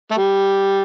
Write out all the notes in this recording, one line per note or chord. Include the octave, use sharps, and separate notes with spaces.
A3
G3